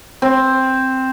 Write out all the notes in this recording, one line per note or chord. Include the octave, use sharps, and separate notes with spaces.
C4